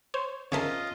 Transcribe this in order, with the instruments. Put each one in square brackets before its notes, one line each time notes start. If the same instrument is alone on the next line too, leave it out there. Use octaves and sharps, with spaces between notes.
[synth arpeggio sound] C5 C#5
[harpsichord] C#3 A#4 G#5 [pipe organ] F4 D#5 [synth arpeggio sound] C#5 E5 A5